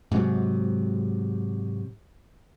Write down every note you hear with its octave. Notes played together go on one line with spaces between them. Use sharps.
G#2 C3 F#3